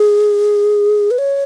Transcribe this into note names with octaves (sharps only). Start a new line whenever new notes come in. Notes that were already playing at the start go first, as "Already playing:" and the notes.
Already playing: G#4
B4
C#5